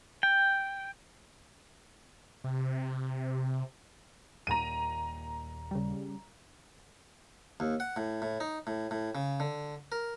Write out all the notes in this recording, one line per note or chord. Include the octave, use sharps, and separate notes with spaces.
G5
C3
D#1 D#2 A#2 A#5 D#7
C#3 G3
D#2
F#5
A2
A2
D#4
A2
A2
C#3
D3
A#4